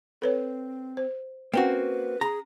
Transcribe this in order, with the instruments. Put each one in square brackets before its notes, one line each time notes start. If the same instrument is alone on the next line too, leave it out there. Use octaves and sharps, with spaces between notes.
[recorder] C4 [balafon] A4 B4 C#5
[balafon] C5
[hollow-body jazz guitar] A#3 C4 F#4 [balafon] C#4 G5 [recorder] B4
[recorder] G#4 [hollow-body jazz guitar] A#5